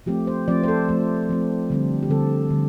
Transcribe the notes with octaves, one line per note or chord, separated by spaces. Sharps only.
F3 A3 C4 G4
C5
F3 A3 C4 D5
C5
A4
F3 A3 C4
F3 A3 C4
D3 G3 C4
G4
D3 G3 C4 A4
D3 G3